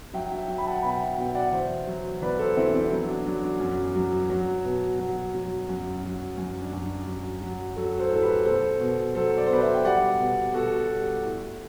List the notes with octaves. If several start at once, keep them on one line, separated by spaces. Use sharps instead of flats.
F#3 E5 G5
E5 G5
F#3 E5 G5
B5
F#5 A5
B2 G5 B5
E5 G5
B2 E5 G5
G5
D5 F#5
E2 C5 E5
F#3
E2 B4 D5
A4 C5
E2 C4 E4
D4
C4 E4
F#3 D4
D4
F#3 D4
D4
F#2
F#3
F#3
B2
F#3
F#3
F#2
F#3
F#2
D4
F#2
D4
F#3
F#3
F#3 F#4 A4
A4 C5
A2 A4
G4 B4
B2 A4 C5
B2
F#3 A4 C5
D5
C5
B2 B4 D5
C5 E5
G5
G3 D5 F#5
B2
B2 F#4 A4
G3
A2